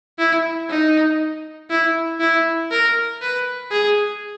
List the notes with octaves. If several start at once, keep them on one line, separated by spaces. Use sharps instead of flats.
E4
D#4
E4
E4
A#4
B4
G#4